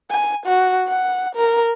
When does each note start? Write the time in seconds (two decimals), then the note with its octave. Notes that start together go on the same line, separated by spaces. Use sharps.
0.11 G#5
0.46 F#4
0.88 F#5
1.35 A#4